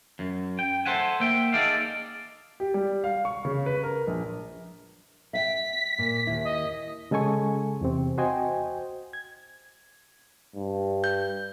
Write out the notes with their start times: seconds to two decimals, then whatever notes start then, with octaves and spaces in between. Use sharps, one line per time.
0.19 F#2
0.59 G5
0.85 A4 C5 E5 F#5 G#5
1.20 A#3 E5 G5
1.53 D#4 G#4 A4 D5 E5 F5
2.60 G4
2.74 G3
3.04 F5
3.25 C#6
3.45 C#3
3.66 B4
3.83 A#4
4.07 A#1
5.33 E5 F5 G5 B6
5.98 A#2
6.27 D#2 E4
6.44 D#5
7.11 C#3 G#3 A4 G#5 C#6
7.81 E2 C3 C4
8.18 F#4 C5 D#5 G5 G#5
9.13 G#6
10.56 G2
11.04 G6